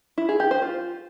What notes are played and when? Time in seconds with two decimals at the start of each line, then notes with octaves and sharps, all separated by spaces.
0.18 E4
0.29 G#4
0.40 G4
0.51 C5
0.62 F4